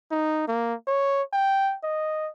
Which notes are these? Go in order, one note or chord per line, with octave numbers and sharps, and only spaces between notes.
D#4
A#3
C#5
G5
D#5